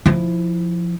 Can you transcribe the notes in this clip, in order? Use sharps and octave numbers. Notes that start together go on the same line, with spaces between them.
F3 E4